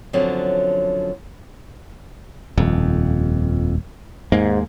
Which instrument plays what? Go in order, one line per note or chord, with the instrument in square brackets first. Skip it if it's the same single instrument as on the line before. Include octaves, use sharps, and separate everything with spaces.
[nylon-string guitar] F#2 D3 F3 F#3 B3 C4
[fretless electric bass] D#1 [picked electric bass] F2
[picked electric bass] D#2 G#3 A#3 [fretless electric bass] G#2